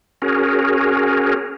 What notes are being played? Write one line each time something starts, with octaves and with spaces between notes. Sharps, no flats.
C#4 F#4 G#4 A#4